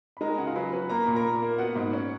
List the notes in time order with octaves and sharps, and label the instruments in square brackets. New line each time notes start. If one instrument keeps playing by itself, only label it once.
[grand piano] B5
[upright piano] G#3 [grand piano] A#4 A#5
[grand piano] G#4 G#5
[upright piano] C#3 [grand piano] F#4 F#5
[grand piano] F4 F5
[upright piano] F#3 [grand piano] B4 B5
[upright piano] F#3 [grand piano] B4 B5
[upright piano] A#3 [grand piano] A#5
[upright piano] A#2 [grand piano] B5
[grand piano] A#4 A#5
[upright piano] A#2
A#3
[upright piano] B3 [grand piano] F#4 F#5
[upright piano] G#2
C#4